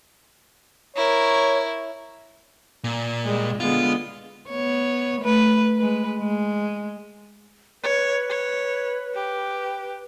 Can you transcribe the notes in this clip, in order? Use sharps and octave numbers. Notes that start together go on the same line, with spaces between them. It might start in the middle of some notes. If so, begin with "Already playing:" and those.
E4 A#4 C#5
A#2
G3 G#3
D3 G#3 B3 F4
B3 C#5
A3 B4
G#3 B4
G#3
B4 C#5
C#5
G4